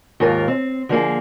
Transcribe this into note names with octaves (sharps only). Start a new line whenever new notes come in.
D#2 G#2 F4 A#4
C4
D3 F3 A#3 G#4